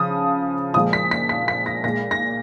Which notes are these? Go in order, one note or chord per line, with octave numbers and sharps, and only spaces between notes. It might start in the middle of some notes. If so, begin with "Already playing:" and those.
Already playing: C#3 F3 D#6
A#2 F3 G#3 D#6
B6
B6
B6
B6
A#6
A#2 G#3 A#6
A#6